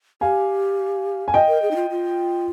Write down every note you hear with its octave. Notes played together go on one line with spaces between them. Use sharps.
G4 F5 G#5
G#5
D#5 G5
A#4
G#4
D#4
F4
F4